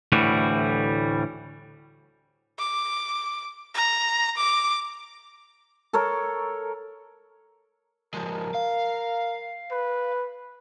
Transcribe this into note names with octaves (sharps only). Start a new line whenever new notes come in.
D2 A2 E3 G3 F#4
D6
A#5
D6
A4 A#4 C#5
F3 G#3 A#4
F5
B4